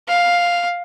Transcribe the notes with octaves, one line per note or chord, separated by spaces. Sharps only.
F5